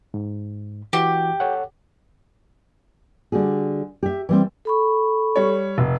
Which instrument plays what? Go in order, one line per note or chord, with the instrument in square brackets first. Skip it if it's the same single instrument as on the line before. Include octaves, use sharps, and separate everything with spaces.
[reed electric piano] G#2
[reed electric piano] E3 F#4 [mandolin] G4
[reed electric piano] A4 C#5 F#5
[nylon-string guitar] D3 G3 F#4 G#4
G4 E5
E3 G3 C4
[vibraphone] A4 B5 C#6
[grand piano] G3 C#5
F1